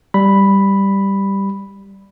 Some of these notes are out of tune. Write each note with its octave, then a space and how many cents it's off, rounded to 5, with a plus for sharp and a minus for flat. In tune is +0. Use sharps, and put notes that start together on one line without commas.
G3 +0 B5 +0